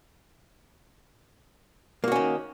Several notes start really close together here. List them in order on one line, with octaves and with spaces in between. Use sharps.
A#3 F#4 C#4 D#3